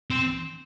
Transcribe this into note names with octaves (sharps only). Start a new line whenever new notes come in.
C4